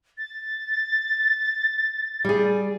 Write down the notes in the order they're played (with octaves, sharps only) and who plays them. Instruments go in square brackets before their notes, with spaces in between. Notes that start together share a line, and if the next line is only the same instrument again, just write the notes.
[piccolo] A6
[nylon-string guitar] G3 G#4